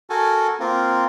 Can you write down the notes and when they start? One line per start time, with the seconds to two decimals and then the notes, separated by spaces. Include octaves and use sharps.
0.10 F#4 A4 A#4 G#5 A5
0.60 A#3 C4 F4 A#4